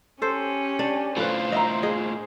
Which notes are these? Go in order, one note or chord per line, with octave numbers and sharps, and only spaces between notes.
C#4 G4 A4 C5
D4 D5
A2 F4 A4 B4 C5
D#5 E5 A#5
G#4 D#5